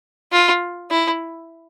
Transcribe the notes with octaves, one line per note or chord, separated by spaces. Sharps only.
F4
E4